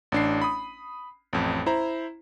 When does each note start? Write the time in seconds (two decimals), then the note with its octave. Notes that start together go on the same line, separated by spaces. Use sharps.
0.12 A1 D4 C7
0.42 B5 D#6
1.33 A1 F2
1.66 E4 C5 A#5